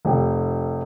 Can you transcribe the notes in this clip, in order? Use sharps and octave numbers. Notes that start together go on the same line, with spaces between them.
F1 G5